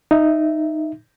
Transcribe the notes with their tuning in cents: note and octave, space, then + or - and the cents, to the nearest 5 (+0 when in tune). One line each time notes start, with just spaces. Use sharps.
D#4 -10 E5 +0